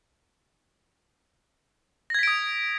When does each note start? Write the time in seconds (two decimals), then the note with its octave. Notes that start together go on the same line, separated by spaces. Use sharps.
2.10 A#6
2.14 G#6
2.19 B6
2.23 D7
2.27 D#6